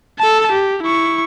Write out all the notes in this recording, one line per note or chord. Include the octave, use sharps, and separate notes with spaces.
A4 A5
G4
E4 C#6